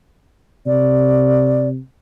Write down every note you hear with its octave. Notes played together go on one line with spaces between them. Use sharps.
C3 D5